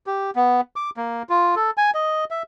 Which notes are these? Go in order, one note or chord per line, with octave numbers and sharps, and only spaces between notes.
G4
B3
D6
A#3
F4
A4
G#5
D#5
E5